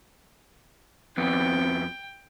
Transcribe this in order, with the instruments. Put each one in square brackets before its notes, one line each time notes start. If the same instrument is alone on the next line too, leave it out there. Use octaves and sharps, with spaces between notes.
[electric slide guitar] F2 B3 [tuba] C4 [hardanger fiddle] G5